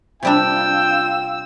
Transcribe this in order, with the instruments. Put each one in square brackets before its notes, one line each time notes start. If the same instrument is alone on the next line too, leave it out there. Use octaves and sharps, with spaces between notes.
[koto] C3 G3 D4 [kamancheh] F4 E6 [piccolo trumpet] G5